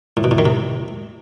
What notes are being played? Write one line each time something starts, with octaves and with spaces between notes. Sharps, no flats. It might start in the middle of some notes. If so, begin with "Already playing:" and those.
A2
B2
A2
D#3
C3